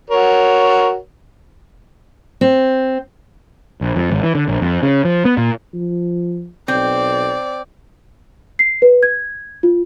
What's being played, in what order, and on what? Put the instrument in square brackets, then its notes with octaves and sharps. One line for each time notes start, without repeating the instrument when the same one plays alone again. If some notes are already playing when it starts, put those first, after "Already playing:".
[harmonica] F#4 A#4 C#5
[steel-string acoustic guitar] C4
[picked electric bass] A#1
F2
G#1
E3
D3
A#1
F2
C#3
F3
B3
A#2
[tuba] F3
[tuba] B1 [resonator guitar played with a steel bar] C4 [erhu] D5
[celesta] C7
B4
G#6
F4